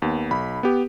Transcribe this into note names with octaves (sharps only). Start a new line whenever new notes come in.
D#2 B3
B1 B5
B3 G4